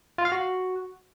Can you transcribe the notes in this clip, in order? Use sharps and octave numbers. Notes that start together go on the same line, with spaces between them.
F4
F5
F#4